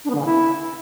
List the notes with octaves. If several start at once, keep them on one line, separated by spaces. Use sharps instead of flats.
D4
B3
D3
C#3
E4